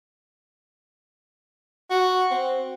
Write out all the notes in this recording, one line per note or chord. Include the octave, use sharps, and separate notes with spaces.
F#4
C4